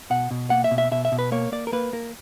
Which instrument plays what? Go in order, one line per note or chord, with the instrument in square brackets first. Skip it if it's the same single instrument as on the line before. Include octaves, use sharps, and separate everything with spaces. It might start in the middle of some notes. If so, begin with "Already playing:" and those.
[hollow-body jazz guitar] B2 F#5
B2
A#3 F#5
E5
B2
E5
B2 E5
E5
B2
B4
A#3 C#5
A#3 D5
A#4
A#3 B4
A#3 A#4